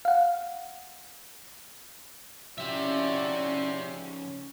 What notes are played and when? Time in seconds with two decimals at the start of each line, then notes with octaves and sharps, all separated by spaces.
0.05 F5 F#5
2.58 C#3 F3 C#4 E4 F#4 G4 D5 E5